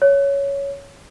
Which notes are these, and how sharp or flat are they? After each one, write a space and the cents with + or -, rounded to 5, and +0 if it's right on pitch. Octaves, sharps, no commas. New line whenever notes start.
C#5 +10